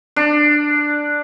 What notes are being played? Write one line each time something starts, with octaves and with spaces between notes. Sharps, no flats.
D4